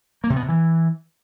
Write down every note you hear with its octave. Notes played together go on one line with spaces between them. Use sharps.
A#3
C3
B3
C3
E3